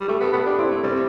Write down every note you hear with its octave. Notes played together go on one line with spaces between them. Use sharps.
G3
A3 G4
B3 A4
B3 A4
D4 G4
C4 E4
A3
G3 C4